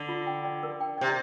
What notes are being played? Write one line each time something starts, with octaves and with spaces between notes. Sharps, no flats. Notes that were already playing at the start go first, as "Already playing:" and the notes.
Already playing: D3
F4
G5
D5
A#4
G5
C3 D5